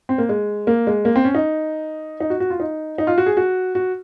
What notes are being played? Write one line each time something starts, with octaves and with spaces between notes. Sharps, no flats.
C4
A#3
G#3
A#3
G#3
A#3
C4
C#4
D#4
D#4
F#4
F#4
F4
D#4
D#4
F4
F#4
G#4
F#4
F#4